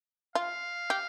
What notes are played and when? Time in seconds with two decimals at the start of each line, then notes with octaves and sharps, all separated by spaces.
0.35 F4 F5
0.90 G4